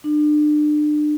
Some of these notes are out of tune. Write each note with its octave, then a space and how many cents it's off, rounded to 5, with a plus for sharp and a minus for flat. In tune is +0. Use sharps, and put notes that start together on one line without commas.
D4 +35